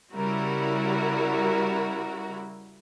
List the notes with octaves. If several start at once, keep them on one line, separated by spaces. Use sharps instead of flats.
C#3 G3 E4 F#4 A#4